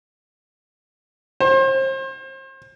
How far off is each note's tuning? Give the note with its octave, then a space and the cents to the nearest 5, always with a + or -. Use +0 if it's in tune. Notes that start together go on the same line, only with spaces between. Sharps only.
C5 +35